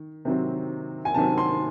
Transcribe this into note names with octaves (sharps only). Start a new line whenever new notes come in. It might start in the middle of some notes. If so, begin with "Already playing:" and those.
Already playing: D#3
C3 D#3 F#3 C4
G#5
C3 D#3 F#3 C4 A5
C6